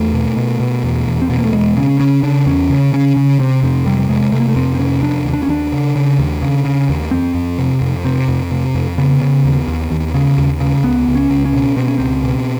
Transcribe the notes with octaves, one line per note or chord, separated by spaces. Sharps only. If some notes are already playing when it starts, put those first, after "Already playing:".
Already playing: E2 A3
B2
B2
B2
E2
E2
C4
B2 B3
A#3
A3
E2 G#3
C#3 C#4
C#3 C#4
C#3 D4
E2 C#4
C#3
C#3 C#4
C#3
C3 C4
F2 C4
C3 G3
G3
C3 G#3
C3 A3
A#3
A3
F2 C4
C4
C3 C#4
F2 D4
D#2
D4
C#4
D#2 D4
C#3
C#3
D#2
C#3
C#3
D#2
F2 C4
F2
C3
F2
C3 C4
F2
C3
F2
C#3 B3
C#3
D#2
D#2
D#2
C#3
D#2
C#3
C#2 B3
C#2
C#4
C#2
C#4
B2
B2 C4
C#4
C#2 C4
B2